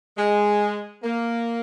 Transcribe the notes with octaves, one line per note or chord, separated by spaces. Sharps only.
G#3
A#3